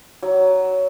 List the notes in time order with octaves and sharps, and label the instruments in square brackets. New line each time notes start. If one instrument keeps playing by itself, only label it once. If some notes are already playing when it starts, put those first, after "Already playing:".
[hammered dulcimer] F#3